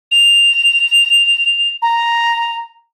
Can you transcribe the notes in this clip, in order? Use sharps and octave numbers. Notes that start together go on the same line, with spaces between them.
F7
A#5